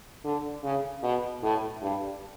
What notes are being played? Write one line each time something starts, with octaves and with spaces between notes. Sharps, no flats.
D3
C#3
B2
A2
G2